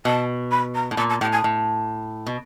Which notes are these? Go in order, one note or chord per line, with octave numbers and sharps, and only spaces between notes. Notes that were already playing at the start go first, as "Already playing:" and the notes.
B2 A5
B5
A#5
A2
A#2 A5
A5
A2 G5
G#5
A2
B2